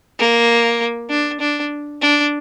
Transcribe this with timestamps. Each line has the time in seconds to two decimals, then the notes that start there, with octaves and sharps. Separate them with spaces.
0.19 A#3
1.10 D4
1.40 D4
2.01 D4